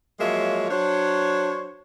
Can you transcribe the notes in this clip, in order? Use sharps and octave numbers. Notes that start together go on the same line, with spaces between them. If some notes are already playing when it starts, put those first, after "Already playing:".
F3 F#3 G#3 A#3 C#5 E5
F#3 D4 C5 C#5